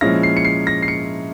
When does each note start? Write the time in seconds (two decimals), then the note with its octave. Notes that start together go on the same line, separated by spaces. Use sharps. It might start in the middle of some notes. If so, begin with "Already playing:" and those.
0.01 A#2 F3 G#3 C#4 E4 A#6
0.23 C7
0.37 C#7
0.45 C7
0.67 A#6
0.82 C7
0.88 C#7